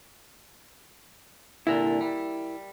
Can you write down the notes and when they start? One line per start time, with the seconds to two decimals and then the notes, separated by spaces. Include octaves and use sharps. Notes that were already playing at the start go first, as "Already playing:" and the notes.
1.67 C2 A#2 D3 E4 A#4
2.01 G3